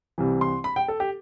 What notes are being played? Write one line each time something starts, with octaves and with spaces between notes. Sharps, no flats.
C2 C3 E3
C6
B5
G5
A4
G4